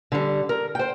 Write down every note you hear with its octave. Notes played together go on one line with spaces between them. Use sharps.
D3 G3
A#4
C5 G5